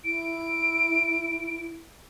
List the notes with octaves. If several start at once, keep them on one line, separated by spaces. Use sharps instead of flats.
E4 D7